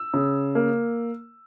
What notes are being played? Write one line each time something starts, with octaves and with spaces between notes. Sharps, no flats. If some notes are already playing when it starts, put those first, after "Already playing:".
Already playing: E6
C#3
A#3